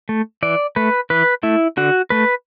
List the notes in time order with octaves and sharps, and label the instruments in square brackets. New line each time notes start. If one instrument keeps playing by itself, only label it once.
[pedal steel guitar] A3
E3 D5
A3 B4
E3 B4
A3 E4
D3 F#4
A3 B4